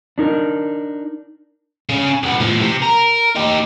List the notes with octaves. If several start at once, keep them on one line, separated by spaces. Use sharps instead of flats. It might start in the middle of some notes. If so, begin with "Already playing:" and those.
D4 D#4 A#4
C#3 C#4
C2 B3
A2 F3
C3
A#4
D#4 G4